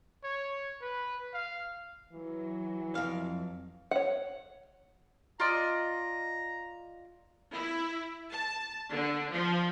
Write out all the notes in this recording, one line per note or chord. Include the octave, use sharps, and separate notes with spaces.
C#5
B4
F5
E3 F#3
F2 F5
C#5 F#5
F4 D5 D#5 A#5
E4
A5
D3
F3